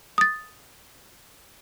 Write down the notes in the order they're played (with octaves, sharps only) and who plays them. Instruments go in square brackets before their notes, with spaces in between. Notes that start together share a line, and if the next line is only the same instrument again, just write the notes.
[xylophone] D#6 A6